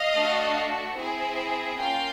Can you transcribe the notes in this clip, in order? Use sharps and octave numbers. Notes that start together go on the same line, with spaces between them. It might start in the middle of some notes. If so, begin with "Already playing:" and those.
Already playing: D#5 F5
A3 D4 F#4
C4 E4 G#4
A#3 C#4 F4 F5 G5